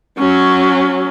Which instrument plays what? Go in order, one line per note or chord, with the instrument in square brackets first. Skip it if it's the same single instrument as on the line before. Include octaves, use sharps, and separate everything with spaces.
[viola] F#3 C#4